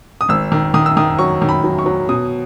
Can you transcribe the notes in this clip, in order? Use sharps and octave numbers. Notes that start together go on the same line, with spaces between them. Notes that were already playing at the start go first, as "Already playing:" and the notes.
D#6
G#1 E6
D#3
D#3 D#6
E6
D#3 D#6
F#3 C#6
D#3
B5
F#3
C#6
F#3
B2 D#6